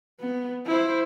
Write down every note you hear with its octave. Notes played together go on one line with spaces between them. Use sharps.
B3
E4 C5